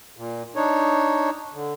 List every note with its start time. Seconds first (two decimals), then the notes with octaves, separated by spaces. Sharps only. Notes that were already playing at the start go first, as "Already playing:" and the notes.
0.17 A#2
0.56 D4 D#4 C#5
1.54 D3